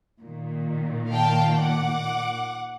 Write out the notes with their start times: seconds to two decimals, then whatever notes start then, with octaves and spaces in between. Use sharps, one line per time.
0.21 A#2 D#3
1.11 F5 G5 A5
1.59 F#5 D6